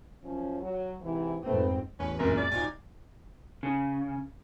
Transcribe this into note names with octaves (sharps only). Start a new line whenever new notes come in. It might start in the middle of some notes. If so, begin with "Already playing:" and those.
F#2 F3 C#4
F#3 F#4
G#2 C3 E3
F2 G#2 A3 C4 B4
A1 E2 C#4 B4
C#2 F#2 A#2 A#4
D5
D1 D#4 F4 G#5
C#3